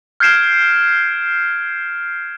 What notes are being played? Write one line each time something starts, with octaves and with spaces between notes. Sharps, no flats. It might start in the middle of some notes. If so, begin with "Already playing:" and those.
F6 G6 G#6 C7 D7 E7